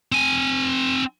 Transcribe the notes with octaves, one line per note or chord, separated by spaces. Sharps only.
C4 G#5